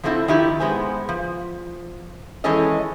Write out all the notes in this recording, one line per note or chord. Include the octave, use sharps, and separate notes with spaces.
F3 F#3 A3 C4 D#4 E4
D#3 F3 E4 G4
G#3 B3 C5 G#5
F3
D#3 E3 G#3 C#4 A4 D#5